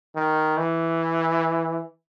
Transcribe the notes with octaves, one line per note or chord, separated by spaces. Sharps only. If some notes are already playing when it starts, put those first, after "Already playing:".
D#3
E3